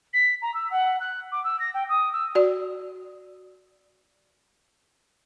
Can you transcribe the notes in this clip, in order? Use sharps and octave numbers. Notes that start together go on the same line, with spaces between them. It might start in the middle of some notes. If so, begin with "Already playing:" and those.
B6
A#5
E6
F#5
F#6
D6
E6
A#6
G5
D#6
E6
F#4 D5